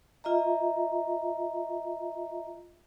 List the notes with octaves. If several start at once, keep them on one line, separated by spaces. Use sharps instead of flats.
F4 D#5 E5 A#5